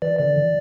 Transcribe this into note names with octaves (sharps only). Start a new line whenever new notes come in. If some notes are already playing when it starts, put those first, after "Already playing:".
E3 D5
D3 D5
E3